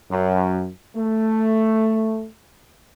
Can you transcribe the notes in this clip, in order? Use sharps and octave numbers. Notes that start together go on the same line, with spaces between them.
F#2
A3